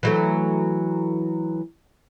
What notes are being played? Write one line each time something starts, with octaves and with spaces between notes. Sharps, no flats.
E3 F#3 A3